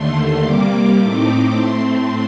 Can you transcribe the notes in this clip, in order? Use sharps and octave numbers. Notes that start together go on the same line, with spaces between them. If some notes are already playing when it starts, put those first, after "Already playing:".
Already playing: D#2 D3 A3 C6
C3 G3 A#3 D6
A2 A3 C4 D#4
A2 A3 C4 C6